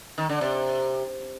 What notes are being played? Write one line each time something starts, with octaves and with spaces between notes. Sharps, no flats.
D#3
D3
C3